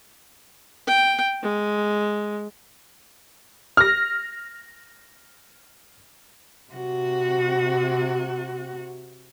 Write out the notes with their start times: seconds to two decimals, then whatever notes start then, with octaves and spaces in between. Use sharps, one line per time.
0.87 G5
1.43 G#3
3.77 F6 A#6
6.72 C3 F#4